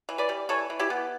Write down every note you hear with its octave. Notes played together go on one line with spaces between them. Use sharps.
E3
B4 D5
G3
E3 A4 C#5
E3
E4 G4
B3